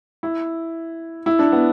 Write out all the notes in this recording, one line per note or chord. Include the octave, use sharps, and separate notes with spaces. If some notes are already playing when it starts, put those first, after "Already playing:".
E4
E4
D4
B3